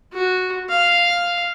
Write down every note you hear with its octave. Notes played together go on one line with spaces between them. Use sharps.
F#4
F5